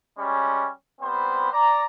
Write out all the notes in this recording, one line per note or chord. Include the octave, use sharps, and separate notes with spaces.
G3 G#3 C#4
G3 B3 C4 C5 B5
D5 A#5